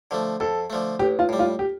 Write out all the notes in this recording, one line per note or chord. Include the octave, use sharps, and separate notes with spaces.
D3 F3 A3
F2 A4
D3 F3 A3
A1 G4
F4
A2 G3
F4
G4